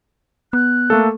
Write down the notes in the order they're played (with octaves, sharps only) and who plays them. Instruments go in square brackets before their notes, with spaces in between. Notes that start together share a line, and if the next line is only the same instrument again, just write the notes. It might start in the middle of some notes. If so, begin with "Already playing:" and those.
[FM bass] B3 [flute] F#6
[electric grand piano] A3 A#3 A4